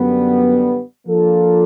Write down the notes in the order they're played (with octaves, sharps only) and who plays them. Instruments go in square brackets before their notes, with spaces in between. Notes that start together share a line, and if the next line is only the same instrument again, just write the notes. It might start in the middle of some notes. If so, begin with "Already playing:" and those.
Already playing: [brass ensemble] F#2 D3 G3 B3
F3 A#3 D4 F4 A4